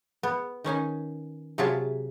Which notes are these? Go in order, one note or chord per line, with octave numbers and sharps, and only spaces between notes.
B3
D#3 C#4 D#4 G#5
C3 F#3 F4 G#4 E5 A5